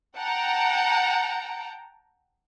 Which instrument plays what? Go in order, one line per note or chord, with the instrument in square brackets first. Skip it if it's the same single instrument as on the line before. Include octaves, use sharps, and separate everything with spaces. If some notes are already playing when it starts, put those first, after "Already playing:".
[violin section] F#5 G5 A5 A#5